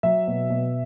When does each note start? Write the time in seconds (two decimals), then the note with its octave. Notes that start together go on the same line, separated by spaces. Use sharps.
0.03 F#3 E5
0.27 B2
0.50 B2